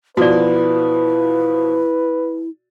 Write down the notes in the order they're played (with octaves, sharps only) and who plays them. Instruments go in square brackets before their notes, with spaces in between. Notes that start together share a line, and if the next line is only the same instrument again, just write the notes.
[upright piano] B2 F3 [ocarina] E4 [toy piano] F#4 D5 [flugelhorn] B4